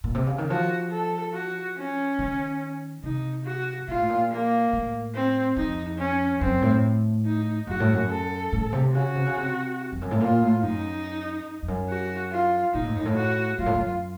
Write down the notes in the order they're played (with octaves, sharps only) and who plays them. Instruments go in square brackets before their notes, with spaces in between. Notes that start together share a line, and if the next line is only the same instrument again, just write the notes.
[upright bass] A#2
C3
C#3
D#3
[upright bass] F3 [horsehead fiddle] F#4
[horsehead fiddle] A4
F#4
C#4
[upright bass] D#3
[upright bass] C3 [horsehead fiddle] D#4
[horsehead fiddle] F#4
[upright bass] A#2 [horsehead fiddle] F4
[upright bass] A2
A#2
[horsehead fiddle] A#3
[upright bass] A2
[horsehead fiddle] C4
[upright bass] F2 [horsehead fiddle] D#4
[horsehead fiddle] C#4
[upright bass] F#2 [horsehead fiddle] C4
[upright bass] A2
[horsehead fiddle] D#4
[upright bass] F#2 [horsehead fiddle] F#4
[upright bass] A2
F#2
[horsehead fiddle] A4
[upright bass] A2
C3
[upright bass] C#3 [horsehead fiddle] F#4
[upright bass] C3
C#3
C3
F2
F#2
A2
[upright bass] A#2 [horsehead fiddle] F4
[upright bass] A2
[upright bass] F#2 [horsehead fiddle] D#4
[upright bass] F2
F#2
[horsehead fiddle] F#4
F4
[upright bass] A#2 [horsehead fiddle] D#4
[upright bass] A2
F#2
A2
[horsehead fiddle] F#4
[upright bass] F#2 [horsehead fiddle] F4
[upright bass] A2
F#2